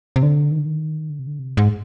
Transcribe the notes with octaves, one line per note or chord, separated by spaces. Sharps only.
C3
D3
D#3
D3
D#3
D3
C3
D3
C3
G#2